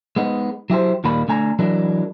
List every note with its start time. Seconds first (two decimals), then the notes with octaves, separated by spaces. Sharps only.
0.16 G#3 B3 D#4
0.70 F#3 E4 G4 C5
1.04 D#2 A#2 D#3 G3 A#3 B5
1.28 D3 A3 G#5 A#5
1.59 E3 F#3 G#3 D4 E4 A#4